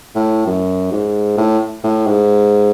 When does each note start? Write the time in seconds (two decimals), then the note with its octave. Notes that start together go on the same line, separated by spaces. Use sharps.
0.15 A2
0.46 F#2
0.92 G#2
1.38 A2
1.84 A2
2.07 G#2